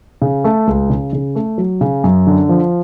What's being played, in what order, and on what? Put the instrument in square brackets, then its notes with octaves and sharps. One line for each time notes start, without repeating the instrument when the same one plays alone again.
[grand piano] C#3
A3
C#2
C#3
C#3
A3
F#3
C#3
F#2
D3
F3